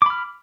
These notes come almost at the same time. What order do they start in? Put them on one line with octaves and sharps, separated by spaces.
D6 B5 F6